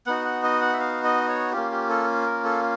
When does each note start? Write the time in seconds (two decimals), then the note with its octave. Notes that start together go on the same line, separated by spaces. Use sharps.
0.06 B3 D#4 F#4 F#5
0.25 F#5
0.43 D#5
0.61 F#5
0.73 E5
0.80 F5
1.04 D#5
1.29 C#5
1.52 A#3 C#4 F4 G4
1.71 G4
1.89 A4
2.26 A#4
2.44 A4